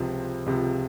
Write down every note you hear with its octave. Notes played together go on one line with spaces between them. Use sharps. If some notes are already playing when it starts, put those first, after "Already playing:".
Already playing: C#2 C3 F3
C#2 C3 F3